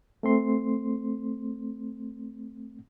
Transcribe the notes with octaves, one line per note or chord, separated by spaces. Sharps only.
A3 C4 C6